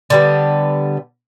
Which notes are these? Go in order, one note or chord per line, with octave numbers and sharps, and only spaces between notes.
D3 G3 B3